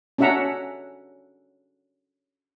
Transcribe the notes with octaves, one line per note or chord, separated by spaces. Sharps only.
C#4 D4 F#4 E5 F#5 A#5